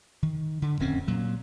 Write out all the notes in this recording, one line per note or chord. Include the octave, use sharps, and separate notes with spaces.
D#3
D3
D1 F2 C4 C#4
A#2 F#3